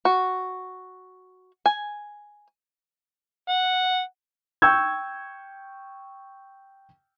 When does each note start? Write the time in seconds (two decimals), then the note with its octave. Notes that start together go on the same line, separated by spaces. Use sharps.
0.05 F#4
1.66 G#5
3.49 F#5
4.62 G5 C#6 E6 G6 G#6